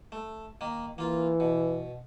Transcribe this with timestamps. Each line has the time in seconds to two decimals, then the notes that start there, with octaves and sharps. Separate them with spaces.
0.12 A3
0.61 D#3 A#3
0.98 E3 A#3 F4
1.40 B2